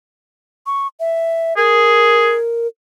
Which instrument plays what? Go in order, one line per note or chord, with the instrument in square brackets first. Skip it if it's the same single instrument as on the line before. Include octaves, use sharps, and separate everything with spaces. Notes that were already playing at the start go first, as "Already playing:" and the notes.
[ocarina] C#6
E5
[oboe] G#4 [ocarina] A#4